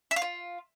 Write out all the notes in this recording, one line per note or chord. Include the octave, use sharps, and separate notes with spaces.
E5
F5
F4